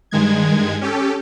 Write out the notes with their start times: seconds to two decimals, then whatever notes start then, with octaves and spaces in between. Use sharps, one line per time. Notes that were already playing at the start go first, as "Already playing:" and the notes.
0.11 G2 D#3 G#3 G#6
0.81 C#4 G4 A4